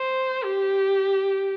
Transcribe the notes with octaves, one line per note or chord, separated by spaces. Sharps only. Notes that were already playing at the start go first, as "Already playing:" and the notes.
Already playing: C5
G4